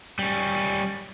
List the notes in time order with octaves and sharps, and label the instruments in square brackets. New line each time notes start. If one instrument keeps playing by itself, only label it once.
[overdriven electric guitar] G3 C#4